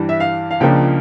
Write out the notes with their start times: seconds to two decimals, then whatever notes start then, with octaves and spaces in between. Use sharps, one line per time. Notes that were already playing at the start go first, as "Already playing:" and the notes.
Already playing: G2 E3 G3
0.09 E5
0.20 F5
0.51 F5
0.60 C#2 C#3 F3 A#3 D4 G5